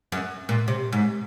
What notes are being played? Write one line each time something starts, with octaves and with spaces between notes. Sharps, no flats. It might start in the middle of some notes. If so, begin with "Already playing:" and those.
F#2
A#2
C3
G#2